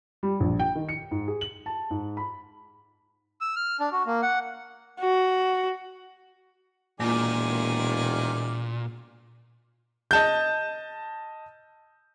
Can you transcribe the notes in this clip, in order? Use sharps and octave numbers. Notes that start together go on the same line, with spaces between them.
G3
A#1
G5
D#3
C#7
G#2
G#4
F#7
A5
G#2
B5
E6
F6
D4
F#4
A#3
F#5
F#4
E1 A#2 D#3 A#3 F4 G#4 D5
D#5 A5 G6